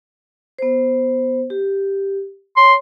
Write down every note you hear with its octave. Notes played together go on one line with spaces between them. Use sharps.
B3 C5
G4
C#5 C6